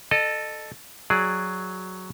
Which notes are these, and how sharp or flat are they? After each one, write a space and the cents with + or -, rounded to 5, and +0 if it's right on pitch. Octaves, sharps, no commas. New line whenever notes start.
A4 +0 D#5 -35
F#3 +0 G#4 +0 D5 +5